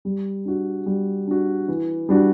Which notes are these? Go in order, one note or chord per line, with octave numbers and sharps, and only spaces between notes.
G3
D4 F#4
G3
D4 F#4
E3
G3 D4 F#4